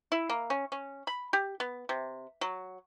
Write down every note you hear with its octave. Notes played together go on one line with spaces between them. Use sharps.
E4
A#3
C#4
C#4
B5
G4
B3
C3
F#3